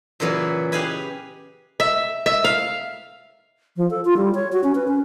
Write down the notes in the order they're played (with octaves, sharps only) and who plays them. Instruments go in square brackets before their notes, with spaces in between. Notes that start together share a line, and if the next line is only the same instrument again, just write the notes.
[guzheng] A#2 C#3 E3 F#3 B3
G4 G#4 B4 F5 G#5 B5
[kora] E5
E5
F5
[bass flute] F3
A4
F4
G3
C#5
F#4
C#4
B4
C#4